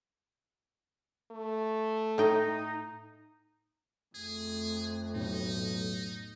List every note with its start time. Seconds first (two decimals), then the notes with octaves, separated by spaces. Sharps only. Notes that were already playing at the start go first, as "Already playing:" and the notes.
1.31 A3
2.18 A2 D#4 G5
4.15 F2 A3 G#4
5.15 B1 A2 D#4